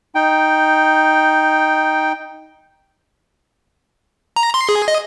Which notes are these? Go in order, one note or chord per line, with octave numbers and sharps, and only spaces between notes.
D#4 G5
A#5
C6
G#4
D#5